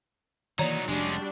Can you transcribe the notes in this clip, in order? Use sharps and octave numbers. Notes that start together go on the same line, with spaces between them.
D#3 E3 F#3 A#3 D#4 C#5 D5 A#5
F1 G3 G#3 C#4 D4 F#4